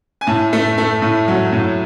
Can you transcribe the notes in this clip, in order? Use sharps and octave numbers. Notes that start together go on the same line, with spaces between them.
G#5
A2 A5
A3
A3
A2
F#3
A2